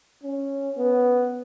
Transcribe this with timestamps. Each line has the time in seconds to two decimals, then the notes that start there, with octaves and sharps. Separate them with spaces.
0.23 C#4
0.77 B3